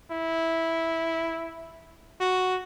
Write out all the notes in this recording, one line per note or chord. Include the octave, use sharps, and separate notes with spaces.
E4
F#4